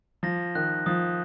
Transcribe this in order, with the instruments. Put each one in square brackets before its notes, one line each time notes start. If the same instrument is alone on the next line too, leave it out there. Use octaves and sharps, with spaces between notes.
[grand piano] F3 [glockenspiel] A#6
[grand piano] D#3 [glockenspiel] F#6
[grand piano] F3 [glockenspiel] D#6